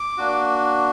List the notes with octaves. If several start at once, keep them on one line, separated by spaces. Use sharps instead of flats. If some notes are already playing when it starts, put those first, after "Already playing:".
Already playing: D6
A#3 D4 F#4